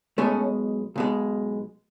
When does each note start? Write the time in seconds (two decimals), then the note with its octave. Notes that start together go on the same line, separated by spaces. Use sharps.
0.18 B1 B2 G#3 A3 C#4
0.96 B1 B2 G#3